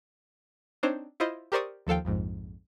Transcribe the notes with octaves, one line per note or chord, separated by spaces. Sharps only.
C4 D4 D#4 C5 C#5
E4 F4 C5 D#5
G4 A#4 C5 D5 C#6 D#6
D#2 F3 A4 F5 G5
A#1 F2 G#2